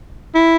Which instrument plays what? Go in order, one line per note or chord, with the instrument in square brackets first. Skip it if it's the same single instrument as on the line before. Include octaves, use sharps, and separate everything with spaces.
[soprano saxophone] E4